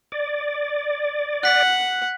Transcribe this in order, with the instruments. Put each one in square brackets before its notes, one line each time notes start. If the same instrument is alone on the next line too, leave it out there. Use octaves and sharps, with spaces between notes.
[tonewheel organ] D5
[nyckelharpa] F#5 [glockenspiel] F#6 B6